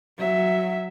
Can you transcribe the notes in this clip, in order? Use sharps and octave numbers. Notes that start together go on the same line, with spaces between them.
F#3 E5